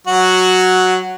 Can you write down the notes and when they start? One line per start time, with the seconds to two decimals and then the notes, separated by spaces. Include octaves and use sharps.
0.07 F#3 F#4